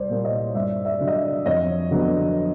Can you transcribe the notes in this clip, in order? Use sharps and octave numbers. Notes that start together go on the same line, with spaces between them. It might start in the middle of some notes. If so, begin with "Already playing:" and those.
Already playing: C2 C5 D5
A#2 G3 A#3
C#5 D#5
G2 D5 E5
D5 E5
D3 F#3
D#5
D5 E5
F2 C#5 D#5
D3 F#3 B3